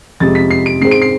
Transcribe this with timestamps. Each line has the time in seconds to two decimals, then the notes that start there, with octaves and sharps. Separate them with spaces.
0.20 F2 C3 G#3 A6
0.35 B6
0.50 C7
0.66 D7
0.81 G#2 G#3 C4 C7
0.91 D7
1.02 C7